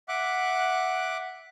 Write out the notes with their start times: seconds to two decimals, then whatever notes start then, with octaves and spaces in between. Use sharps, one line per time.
0.08 E5 F#5 D6 F#6